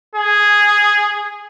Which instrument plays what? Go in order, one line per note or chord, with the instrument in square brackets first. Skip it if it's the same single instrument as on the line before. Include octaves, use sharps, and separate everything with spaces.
[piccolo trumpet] G#4